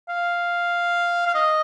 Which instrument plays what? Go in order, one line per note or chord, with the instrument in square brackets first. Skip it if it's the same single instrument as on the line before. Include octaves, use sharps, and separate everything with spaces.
[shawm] F5
F5
D#5